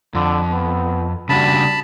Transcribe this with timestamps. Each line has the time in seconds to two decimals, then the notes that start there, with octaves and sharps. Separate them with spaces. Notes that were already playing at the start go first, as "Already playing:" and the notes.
0.15 F2 D3
0.51 B3
1.29 C#3 G3 D4 F#4 A5 B5